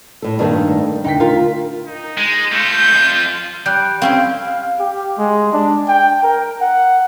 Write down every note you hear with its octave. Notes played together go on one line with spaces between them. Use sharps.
A2 A4
G2 D#3 A3 A#3 D4 A4
D2 D#4 G5 B6
F4 A#4
D#4
G#3
A3 F4 G6
F2 F4
G3 F#6 G6
C4 C#4 E4 F5
F5
G4
G#3
D4
G5
A#4
F#5